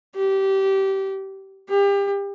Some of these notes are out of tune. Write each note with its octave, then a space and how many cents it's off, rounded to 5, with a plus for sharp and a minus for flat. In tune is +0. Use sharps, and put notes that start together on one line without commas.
G4 -20
G4 +30